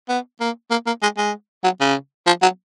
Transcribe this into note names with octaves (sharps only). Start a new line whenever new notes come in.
B3
A#3
A#3
A#3
G#3
G#3
F#3
C#3
F3
F#3